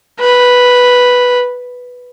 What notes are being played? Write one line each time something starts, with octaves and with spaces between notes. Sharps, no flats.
B4